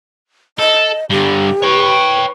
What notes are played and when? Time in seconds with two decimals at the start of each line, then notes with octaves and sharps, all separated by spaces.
0.59 A4 D#5
1.10 G2 D3 G4
1.62 B4 C#5 G5 C#6